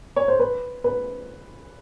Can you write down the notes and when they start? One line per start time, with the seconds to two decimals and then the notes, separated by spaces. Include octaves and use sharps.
0.16 C#5
0.28 C5
0.39 B4
0.84 B4